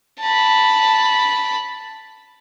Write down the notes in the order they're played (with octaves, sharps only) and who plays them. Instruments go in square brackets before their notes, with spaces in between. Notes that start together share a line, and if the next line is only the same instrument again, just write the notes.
[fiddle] A5 B5